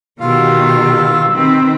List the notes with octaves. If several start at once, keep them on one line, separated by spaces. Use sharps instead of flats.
B2 D#3 B3 F4 G4 F5 E6
D#3 C4 B4